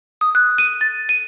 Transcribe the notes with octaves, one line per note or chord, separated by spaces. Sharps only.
D#6
F#6
D#7
A6
D#7